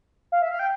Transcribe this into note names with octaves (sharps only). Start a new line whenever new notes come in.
F5
E5
F5
G5